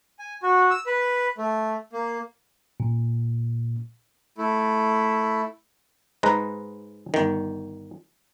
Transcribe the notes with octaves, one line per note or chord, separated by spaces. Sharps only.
G#5
F#4
E6
B4
A3
A#3
A#2
A3 E4
G#2 G#3 B4 A#5
G1 D#3